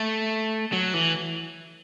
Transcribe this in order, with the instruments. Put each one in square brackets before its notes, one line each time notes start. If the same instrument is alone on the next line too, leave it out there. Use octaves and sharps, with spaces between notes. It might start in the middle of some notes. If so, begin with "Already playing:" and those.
Already playing: [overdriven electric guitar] A3
F#3
E3